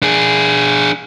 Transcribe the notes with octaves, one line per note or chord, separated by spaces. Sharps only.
D4 G#4